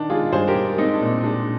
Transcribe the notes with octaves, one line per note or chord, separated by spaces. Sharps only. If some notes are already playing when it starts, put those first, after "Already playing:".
Already playing: D#3 D4
G#3 F4 G#4
G2 G#4 C5
G4 A#4
G2
G#3 C4 D#4
D4
A#2
C4
G#3 D4